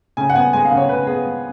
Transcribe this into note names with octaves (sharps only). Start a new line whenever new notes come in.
C#3 G#5
F#5
B3 G#5
G#3 G#5
F5
C#3
C#5
C#3 B4
B3 G#4
G#3